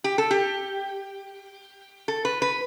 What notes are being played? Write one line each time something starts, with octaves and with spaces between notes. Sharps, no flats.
G4
A4
G4
A4
B4
B4